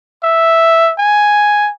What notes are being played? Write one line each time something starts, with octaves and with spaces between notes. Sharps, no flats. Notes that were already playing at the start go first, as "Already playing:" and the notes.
E5
G#5